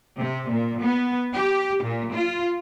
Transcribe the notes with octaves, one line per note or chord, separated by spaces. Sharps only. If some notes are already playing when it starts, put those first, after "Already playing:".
C3
A#2
B3
G4
A#2
F4